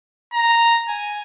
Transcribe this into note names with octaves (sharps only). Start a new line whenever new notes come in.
A#5
G#5